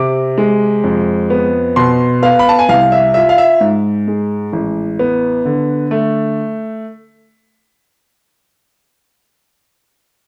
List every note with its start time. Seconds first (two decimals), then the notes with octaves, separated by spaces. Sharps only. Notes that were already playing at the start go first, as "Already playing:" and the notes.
Already playing: C3 D6
0.38 G#3
0.84 F2
1.30 B3
1.76 B2 C6
2.22 B3 F5
2.39 B5
2.49 A5
2.59 G#5
2.69 C2 F5
2.92 E5
3.14 F4 E5
3.29 F5
3.38 E5
3.61 G#2
4.08 G#3
4.53 A1
4.99 B3
5.45 D3
5.91 A3